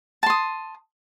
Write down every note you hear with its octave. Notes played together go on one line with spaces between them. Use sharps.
A5 C6 D#6